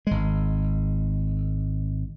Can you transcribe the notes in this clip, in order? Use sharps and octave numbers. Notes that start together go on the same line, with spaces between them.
G#1 G#3